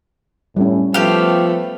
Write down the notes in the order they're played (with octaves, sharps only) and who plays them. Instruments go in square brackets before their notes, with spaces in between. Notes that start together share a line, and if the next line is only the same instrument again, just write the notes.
[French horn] A2 [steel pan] G3 C#4
[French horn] F3 [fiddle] A3 B3 [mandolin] G4 F5